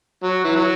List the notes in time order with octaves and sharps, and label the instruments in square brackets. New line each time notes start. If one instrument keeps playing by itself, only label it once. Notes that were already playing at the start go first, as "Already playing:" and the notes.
[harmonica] F#3
E3
F#3